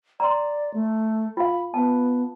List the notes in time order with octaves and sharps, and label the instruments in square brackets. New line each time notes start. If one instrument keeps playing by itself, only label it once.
[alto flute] D5 [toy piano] A#5 C6
[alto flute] A3
[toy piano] F4 F5 [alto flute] B5
[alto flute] B3 [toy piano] A5